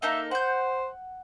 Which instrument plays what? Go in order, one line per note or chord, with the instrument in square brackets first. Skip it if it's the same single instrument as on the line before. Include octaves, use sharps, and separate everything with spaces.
[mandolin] A#3 D#4 A4 [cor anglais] E5
[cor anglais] C5 [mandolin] F#5 G6